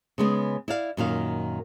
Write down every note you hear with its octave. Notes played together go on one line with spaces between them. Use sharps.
C#3 G#3 B3
E4 D5 F5
F#2 A#2 D#3 F5